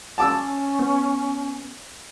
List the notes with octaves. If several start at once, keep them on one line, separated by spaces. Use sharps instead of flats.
C#4 A5 D6 E6
B3